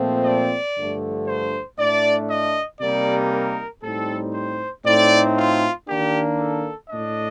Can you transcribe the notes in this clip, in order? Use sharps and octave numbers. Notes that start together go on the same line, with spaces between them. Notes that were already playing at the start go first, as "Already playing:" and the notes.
Already playing: A#2 F3 A3 C4
D5
G2 D3 F3 A3
C5
A2 A3 D4 D5
D#5
C3 G3 A#3 D#4 D5
A#4
A2 G3 C4 D#4 A4
C5
A2 A3 C4 D#4 D5
F4
D#3 A#3 D4 G4
A4
A2 A3 D4 D#5